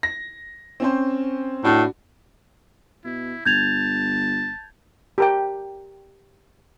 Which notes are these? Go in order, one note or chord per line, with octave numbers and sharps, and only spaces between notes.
A#6
C4 C#4 C5
A2 D4 F#4
B2 E4
G1 A5 G6 G#6 F7
G4 A#4 G5